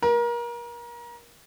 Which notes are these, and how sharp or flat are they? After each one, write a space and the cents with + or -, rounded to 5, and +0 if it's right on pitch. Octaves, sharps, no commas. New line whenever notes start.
A#4 +30